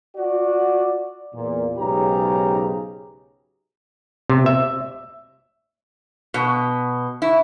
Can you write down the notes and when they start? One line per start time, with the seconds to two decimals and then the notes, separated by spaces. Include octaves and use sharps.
0.16 F4 F#4 D5
1.33 E2 A#2
1.77 B1 G#2 C#3 G4 A#5
4.30 C3
4.46 E5
6.34 B2
7.22 E4